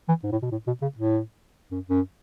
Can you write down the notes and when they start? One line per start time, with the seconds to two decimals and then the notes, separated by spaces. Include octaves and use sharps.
0.08 E3
0.23 G#2
0.32 A2
0.42 B2
0.52 A2
0.67 B2
0.82 C#3
0.97 A2
1.71 F#2
1.89 F#2